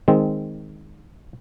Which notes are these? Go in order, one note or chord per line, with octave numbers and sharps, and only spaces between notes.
D#3 G#3 C4